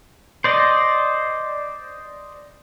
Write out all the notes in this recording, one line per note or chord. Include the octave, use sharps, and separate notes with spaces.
C5 D5 D#5